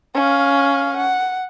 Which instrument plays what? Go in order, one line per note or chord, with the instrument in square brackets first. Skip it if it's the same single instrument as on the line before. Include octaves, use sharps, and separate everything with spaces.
[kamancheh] C#4 F5
F#5